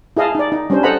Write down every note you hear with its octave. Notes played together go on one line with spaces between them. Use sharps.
E4 G#4 D#5 F5 A5
D#4 D5
D#4
G3 C#4 D4 C5
A4 C5 D#5 F#5 A#5 B5